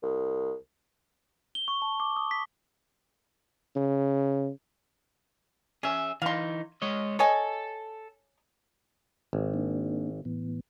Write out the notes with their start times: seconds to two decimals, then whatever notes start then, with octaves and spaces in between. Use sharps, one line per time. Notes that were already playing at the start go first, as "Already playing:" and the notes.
0.02 C2
1.55 G7
1.68 C#6
1.82 A5
2.00 D6
2.16 D#6
2.31 B6
3.76 C#3
5.83 C#4 G#4 E5
6.22 E3 D#4 F5 C6
6.82 G#3 C#5 D#5
7.19 A4 C#5 D#5 G#5
9.33 G#1
9.54 A#3 D4
10.25 A2 E3 B3